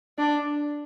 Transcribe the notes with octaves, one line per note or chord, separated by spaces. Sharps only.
D4